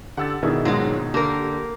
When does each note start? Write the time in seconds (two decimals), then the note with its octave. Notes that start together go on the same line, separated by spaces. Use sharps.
0.17 D3 G4 F#5 E6 A6
0.43 B2 D#3 D4 E4 G#4
0.65 A#1 G#2 F#3 G#3
1.14 D3 A#3 G4 A#4